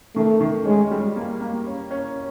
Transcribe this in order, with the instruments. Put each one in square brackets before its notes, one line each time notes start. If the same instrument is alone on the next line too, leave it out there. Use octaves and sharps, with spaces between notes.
[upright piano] D#3 [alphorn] A3
[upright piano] D#3
[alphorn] G#3 [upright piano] C#4
[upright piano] G3
A#3
A#3
C#4
C#4